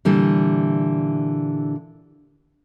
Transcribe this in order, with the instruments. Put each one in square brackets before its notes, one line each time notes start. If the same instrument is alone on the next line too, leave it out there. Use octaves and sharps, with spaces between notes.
[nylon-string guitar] A#2 D3 E3 G3